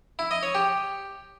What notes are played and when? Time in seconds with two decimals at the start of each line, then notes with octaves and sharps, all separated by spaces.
0.19 E4
0.31 D#5
0.43 C#5
0.55 G4